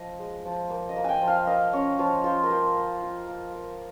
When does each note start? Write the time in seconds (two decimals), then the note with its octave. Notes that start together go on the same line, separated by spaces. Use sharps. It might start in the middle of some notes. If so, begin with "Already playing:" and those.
Already playing: F3 D#5
0.19 G#3
0.45 F3
0.70 A#3
0.89 D#5
0.96 A#3
1.04 G5 G#5
1.21 F3
1.28 F5
1.47 A#3 D#5
1.73 C#4 C#5
1.99 F3 C#5
2.24 F4 C5
2.44 A#4
2.50 A#3 C5
2.76 A#3
3.02 F4
3.27 A#3
3.53 A#3